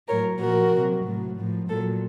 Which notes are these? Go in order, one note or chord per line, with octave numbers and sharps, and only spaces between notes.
A2 F#3 A#4 C#5
A#2 F3 F#4 A#4
C3
F#3
A2 F#3
A2 F3
A#2 F#3 A4